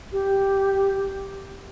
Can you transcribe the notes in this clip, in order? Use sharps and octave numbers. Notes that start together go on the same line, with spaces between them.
G4